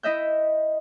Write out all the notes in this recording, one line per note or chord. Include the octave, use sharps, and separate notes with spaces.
E4 D#5 E5 G6